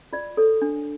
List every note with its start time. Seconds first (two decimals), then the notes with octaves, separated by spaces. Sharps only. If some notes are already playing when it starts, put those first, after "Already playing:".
0.13 F4 D5
0.37 A4 C#5
0.62 D4